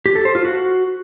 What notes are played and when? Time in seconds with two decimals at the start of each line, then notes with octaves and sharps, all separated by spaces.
0.06 G4
0.15 A4
0.25 C5
0.35 F4
0.45 F#4